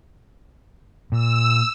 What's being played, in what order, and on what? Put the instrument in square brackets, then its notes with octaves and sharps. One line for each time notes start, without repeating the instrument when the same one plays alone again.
[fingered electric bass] A#2 [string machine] E6